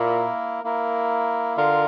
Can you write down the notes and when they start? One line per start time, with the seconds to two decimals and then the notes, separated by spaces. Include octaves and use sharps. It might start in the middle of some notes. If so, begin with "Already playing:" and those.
Already playing: A#2 A#3 E4 A#4
0.64 A#3 E4 A#4
1.57 D3 F4 A#4 F5